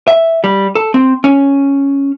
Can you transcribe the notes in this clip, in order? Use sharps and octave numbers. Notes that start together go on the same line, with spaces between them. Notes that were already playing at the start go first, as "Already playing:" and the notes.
E5
G3
A4
C4
C#4